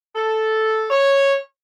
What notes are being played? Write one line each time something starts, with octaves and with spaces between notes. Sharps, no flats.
A4
C#5